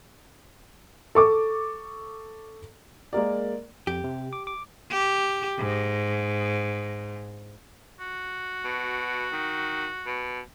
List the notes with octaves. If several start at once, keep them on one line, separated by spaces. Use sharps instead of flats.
A4 C#6 D6
G#3 A#3 A#4 D5
F2 G4
C3
D6
D6
G4
G#2
F#4
B2
D#3
B2